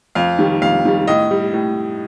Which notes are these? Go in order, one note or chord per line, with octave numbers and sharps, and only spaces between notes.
F2 F5
D#3 G3
F2 F5
D#3 G3
A2 D#5
G3
A2